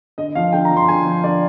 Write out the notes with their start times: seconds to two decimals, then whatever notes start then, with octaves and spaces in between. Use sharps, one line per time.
0.18 D3 D#5
0.35 F3 F5
0.53 D3 G5
0.65 A#5
0.71 F3
0.77 C6
0.88 D3 G#5
1.06 F3
1.24 D3 D5